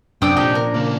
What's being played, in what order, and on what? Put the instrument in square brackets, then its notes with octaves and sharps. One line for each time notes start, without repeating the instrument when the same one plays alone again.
[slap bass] F#2 [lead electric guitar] C3 [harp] D4 [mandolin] G5 D#6 E6
[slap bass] A#2 F3 [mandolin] D#4 G4 A4
[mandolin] A#4
[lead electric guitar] C#3 D4 [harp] A#3